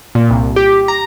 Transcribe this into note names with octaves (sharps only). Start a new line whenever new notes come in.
A#2
C2
G4
A#5